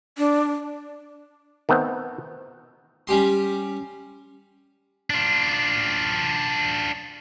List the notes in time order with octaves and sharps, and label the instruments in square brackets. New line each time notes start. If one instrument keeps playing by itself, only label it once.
[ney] D4
[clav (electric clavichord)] D#3 A3 B3 C4
[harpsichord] G3 C#4 G4 C6
[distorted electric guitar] D4 F4